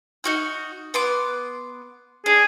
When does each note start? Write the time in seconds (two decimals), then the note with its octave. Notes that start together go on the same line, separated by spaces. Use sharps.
0.24 D#4 F#4 F6
0.94 B3 C6 D6
2.26 D4 G#4